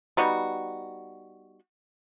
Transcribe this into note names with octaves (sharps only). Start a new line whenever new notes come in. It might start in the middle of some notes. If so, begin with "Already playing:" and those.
G3 B3 D#4 F#4